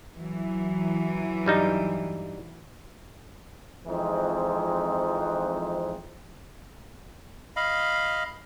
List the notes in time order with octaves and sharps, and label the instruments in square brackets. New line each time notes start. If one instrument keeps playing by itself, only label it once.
[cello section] E3 F#3
[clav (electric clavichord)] G2 G3 D#4
[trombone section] F2 E3 F3 G#3 C4 D#4
[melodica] D#5 F5 B5